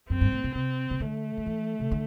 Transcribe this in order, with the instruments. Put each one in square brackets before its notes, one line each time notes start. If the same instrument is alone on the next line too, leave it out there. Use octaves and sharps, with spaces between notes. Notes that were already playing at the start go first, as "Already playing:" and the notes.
[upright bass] F#2 [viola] C4
[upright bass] G2
A2
B2
[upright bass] C3 [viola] C4
[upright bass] C3
[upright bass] D3 [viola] A3
[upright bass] D3
E3
C3
D3